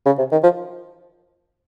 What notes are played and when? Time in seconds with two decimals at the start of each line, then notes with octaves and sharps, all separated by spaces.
0.06 C#3
0.18 C3
0.32 D#3
0.43 F3